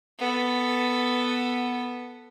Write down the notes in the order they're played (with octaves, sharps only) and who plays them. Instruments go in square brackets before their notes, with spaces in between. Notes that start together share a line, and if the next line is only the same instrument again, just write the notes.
[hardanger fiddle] B3 A4